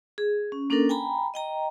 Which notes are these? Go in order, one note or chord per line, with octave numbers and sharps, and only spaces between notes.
G#4
C#4
A#3 C#4 D4 A4 A#4
G5 G#5 A#5 B5
D#5 G5 A#5